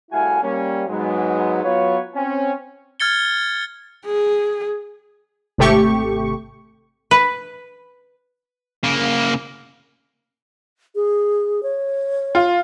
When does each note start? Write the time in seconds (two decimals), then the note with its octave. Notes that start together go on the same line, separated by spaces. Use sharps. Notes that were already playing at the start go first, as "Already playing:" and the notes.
0.11 C2 A2 E4 F#4 F5 G#5
0.42 G3 A#3 C#4
0.88 G#2 F#3 G#3 B3
1.63 F#3 B3 F4 B4 C#5
2.15 C4 C#4
3.00 F6 G#6 A6 C#7 G7
4.05 G#4
5.58 G#1 C3 A3 G4 C#6
7.11 B4
8.84 C#3 A#3
10.95 G#4
11.63 C#5
12.35 F4